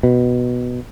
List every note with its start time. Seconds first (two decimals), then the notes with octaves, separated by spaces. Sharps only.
0.03 B2